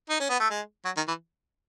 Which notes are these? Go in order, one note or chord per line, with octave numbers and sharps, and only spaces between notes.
D#4
C#4
B3
A3
G#3
F#3
D#3
E3